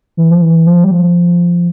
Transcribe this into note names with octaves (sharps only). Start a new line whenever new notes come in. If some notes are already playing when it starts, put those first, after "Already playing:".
E3
F3
E3
F3
G3
F3